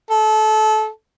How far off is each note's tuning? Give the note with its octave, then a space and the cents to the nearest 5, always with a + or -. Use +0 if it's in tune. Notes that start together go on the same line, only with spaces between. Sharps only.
A4 -25